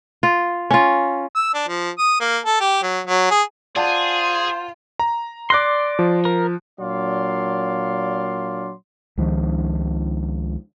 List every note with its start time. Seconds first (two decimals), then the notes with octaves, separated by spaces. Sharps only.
0.23 F4
0.71 C#4 F4
1.35 E6
1.54 D4
1.68 F3
1.99 D#6
2.21 A#3
2.46 A4
2.61 G4
2.83 F#3
3.07 F#3
3.31 G#4
3.76 F4 G#4 C5 D5 F#5 A5
4.99 A#5
5.50 D5 C6 D6 F#6 A#6
5.99 F3
6.25 A#4
6.79 A#2 F#3 D4 D5 F5 C6
9.17 C#2 D#3 F3